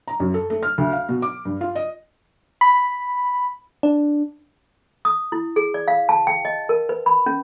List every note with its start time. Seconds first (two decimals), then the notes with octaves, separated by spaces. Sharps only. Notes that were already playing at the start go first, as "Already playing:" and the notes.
0.08 A#5
0.20 F#2
0.34 A4
0.50 A3
0.63 F6
0.78 D2
0.93 F5
1.09 B2
1.22 D6
1.45 G2
1.61 F4
1.75 D#5
2.61 B5
3.83 D4
5.05 D#6
5.32 E4
5.56 G#4
5.74 D5
5.88 F5
6.09 A5
6.27 G5
6.45 D#5
6.69 A#4
6.89 B4
7.06 B5
7.26 C#4